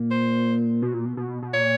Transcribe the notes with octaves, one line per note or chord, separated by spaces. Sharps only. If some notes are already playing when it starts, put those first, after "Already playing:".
Already playing: A#2
C5
B2
A#2
B2
B2
B2
A#2 C#5